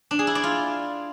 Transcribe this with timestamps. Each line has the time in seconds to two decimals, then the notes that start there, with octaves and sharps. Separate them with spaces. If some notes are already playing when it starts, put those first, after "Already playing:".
0.11 D4
0.19 G#4
0.27 E4
0.35 D5
0.43 F4